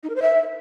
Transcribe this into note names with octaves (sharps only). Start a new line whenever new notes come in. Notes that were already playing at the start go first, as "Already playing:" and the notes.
D#4
A#4
C5
E5